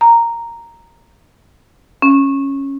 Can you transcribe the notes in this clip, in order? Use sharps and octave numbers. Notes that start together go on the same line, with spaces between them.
A#5
C#4